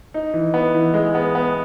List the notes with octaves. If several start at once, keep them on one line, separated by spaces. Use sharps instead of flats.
D#4
E3
B3
E3
G#3
B3
B3